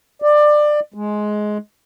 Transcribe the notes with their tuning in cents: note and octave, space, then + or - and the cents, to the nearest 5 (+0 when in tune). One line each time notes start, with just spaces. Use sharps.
D5 +20
G#3 +15